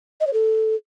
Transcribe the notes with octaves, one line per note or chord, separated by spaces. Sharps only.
D#5
C#5
A4